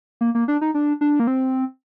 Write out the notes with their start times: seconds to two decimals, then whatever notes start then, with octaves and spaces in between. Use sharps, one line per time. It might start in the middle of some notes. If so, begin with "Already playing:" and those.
0.21 A#3
0.35 A#3
0.48 D4
0.61 D#4
0.74 D4
1.01 D4
1.20 A#3
1.27 C4